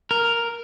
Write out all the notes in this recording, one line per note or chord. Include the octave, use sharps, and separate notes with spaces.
A#4